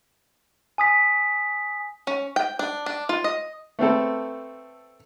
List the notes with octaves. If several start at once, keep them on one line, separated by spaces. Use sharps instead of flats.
G#5 D#6 B6
C#4
G5
D4
D4
F4
D#5
A3 B3 C4 A4